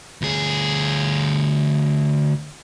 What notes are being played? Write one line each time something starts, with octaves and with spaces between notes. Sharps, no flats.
D2 G#4